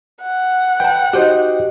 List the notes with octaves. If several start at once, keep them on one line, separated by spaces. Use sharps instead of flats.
F#5
B4 G5 A5
D#4 F#4 G4 C5 G5